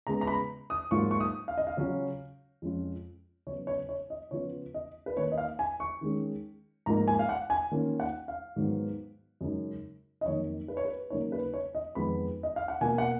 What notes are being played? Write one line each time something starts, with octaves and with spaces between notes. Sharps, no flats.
C#3 G#3 B3 A#5
A#5
B5
D#6
G#2 F#3 A#3 F4 C#6
C#6
D#6
F5
D#5
F5
C#3 F#3 C#4 F4
F2 F3 G#3 C#4 F4
C#3 F#3 B3 C#5
C#5
C#5
D#5
C#3 F3 B3 F4 C#5
D#5
B4
D#3 A#3 D#4 C#5
D#5
F5
G#5
C#6
D#3 G#3 C#4
G#2 F3 A#3 D#4 A#5
G#5
F5
F#5
G#5
D#3 A#3 C#4 F4
F#5
F5
G#2 D#3 F#3 B3
F#2 C#3 G#3 D#4
D#5
F2 D#3 F#3 A#3 D#4 C#5
B4
C#5
B4
C#3 F#3 A#3 D#4 C#5
B4
C#5
D#5
F2 D#3 G#3 B3 B5
D#5
F5
F#5
B2 A#3 F4 G#5
F#5